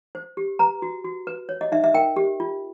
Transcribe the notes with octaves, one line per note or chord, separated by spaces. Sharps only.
C5
G4
B4 A#5
F#4
F#4
B4
C#5
D#5
D#4 E5
E5
A#4 G5
G4
F4